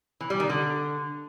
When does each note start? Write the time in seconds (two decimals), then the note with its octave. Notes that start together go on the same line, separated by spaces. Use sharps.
0.21 E3
0.30 G3
0.40 D#3
0.49 D3